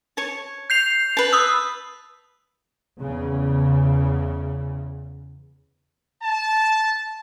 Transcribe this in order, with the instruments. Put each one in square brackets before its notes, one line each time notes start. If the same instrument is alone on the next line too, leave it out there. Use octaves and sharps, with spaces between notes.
[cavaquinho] C#5 A5
[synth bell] G6 C7 F7
[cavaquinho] B4 A5
[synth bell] D#6 E6
[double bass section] E2 C#3
[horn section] A5